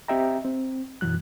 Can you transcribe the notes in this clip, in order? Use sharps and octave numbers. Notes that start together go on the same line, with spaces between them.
C4 G4 D#5 E5 G5 A#5
C4
F#2 B2 E3 F#3 F#6